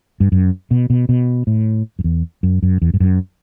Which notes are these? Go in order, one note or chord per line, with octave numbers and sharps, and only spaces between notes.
G2
F#2
B2
B2
B2
A2
F#2
E2
F#2
F#2
E2
G2
F#2